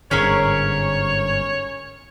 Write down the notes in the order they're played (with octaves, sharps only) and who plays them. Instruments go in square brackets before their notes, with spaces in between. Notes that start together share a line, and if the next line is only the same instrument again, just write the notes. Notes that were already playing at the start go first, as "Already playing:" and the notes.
[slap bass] G1 G#2 D3 [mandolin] C#4 G#4 A#4 [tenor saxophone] C#5